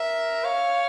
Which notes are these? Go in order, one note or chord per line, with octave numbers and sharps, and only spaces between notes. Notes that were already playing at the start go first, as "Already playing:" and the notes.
Already playing: A#4 E5
C#5 F5